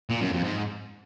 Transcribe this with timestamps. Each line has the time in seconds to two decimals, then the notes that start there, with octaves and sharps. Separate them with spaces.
0.10 A#2
0.21 F#2
0.32 F2
0.43 G#2